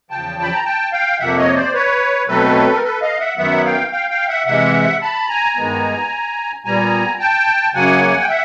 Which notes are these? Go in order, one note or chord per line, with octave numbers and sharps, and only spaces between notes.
E2 C#3 F3 G5 A5
B5
A#5
G5 A5
F5 G5
F2 C3 F3 A#3 E5 F#5
C#5 D#5
C5 D5
B4 C#5
B2 F#3 A3 C4 A4 B4
A#4
A4 B4
D#5 F5
E5 F#5
F#2 D#3 F#3 B3 E5 F#5
F5 G5
F5 G5
F5 G5
E5 F#5
C3 E3 G#3 E5 F#5
A5 B5
G#5 A#5
G2 D#3 G#3 B3
A#2 G3 B3 G#5 A#5
G5 A5
F#2 C#3 F#3 A#3 F#5 G#5
G5
E5 F#5